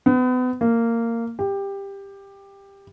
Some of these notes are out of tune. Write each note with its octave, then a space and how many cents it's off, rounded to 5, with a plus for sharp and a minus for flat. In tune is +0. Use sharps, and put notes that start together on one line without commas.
B3 +35
A#3 -15
G4 +15